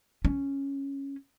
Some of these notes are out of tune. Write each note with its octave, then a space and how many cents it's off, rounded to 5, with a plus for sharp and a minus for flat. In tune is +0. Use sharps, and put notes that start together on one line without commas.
C#4 -5